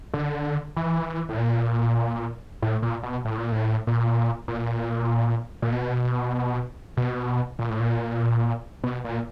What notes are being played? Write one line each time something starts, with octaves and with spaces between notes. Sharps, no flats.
D3
E3
A2
A#2
A2
A#2
B2
A2
A#2
A2
A#2
A#2
A#2
B2
B2
A#2
A2
A#2
B2
A#2